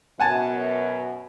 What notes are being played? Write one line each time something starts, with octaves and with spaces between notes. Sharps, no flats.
F#2 B2 F#5 G#5 A5